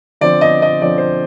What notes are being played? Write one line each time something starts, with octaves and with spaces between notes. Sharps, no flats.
D3 F3 C4 D5
D#5
D#5
D3 F3 C4 D5
C5